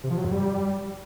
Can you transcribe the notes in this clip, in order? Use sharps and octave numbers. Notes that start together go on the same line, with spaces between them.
C3
F3
F#3
F#2
G3